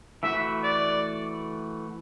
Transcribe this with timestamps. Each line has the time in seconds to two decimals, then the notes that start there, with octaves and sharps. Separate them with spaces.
0.23 E3 A3 F#4 B4 E5
0.64 D5